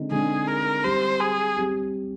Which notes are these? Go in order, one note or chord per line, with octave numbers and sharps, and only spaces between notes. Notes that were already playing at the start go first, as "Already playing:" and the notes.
Already playing: D3 G#3 C4 D#4
D3 G#3 C4 D#4 G#4
A#4
G3 C4 G4 C5
G#4
G3 C4 G4